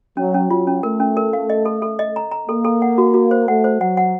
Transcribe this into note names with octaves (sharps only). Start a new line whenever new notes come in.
F#3 C#4
C#4
F#3 F4
C#4
A3 A#4
C#4
A#4
F5
D#5
A4
A4
D#5
A#5
A#5
A#3 A4
A4
F#5
F#4
F#4
C5
A3 F#5
C5
F#3 F#5
F#5